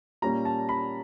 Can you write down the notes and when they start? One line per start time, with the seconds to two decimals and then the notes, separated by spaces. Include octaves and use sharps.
0.22 A#2 G3 A#3 C#4 A#5
0.45 A5
0.69 B5